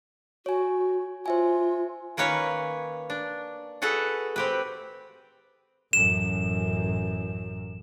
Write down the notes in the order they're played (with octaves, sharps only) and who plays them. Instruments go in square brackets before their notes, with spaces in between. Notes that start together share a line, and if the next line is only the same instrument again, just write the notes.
[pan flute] F#4 [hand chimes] C#5 G#5
[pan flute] F4 [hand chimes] C5 E5 G#5
[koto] D#3 A#3 C#4 B4 C#5
D4
F#4 G#4 A4 B4 F#5
C4 G4 B4
[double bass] A1 F#2 [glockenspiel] E7